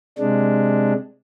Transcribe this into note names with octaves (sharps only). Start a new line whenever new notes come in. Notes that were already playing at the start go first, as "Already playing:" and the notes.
C3 G#3 D4